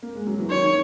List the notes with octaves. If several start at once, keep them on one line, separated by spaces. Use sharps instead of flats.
A#3
G#3
F#3
E3
D#3 C#5